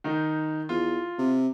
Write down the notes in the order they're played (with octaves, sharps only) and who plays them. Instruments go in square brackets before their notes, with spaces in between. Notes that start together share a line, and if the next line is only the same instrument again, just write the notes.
[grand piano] D#3 D#4
[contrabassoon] E2 [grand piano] F4
[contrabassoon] C3